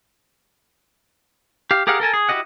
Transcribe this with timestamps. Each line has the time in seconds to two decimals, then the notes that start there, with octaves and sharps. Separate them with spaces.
1.71 G4 F5
1.87 G4 G#4 A#4 F5 F#5
2.00 A4 A#4 G#5 A5
2.14 G#4
2.29 E4 F#4 G4 D#5 F#5